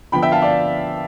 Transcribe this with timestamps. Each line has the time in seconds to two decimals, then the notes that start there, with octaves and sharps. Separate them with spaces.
0.12 D3 F3 B3 G5 B5
0.22 E5 G5
0.32 F5 A5
0.42 D5 F5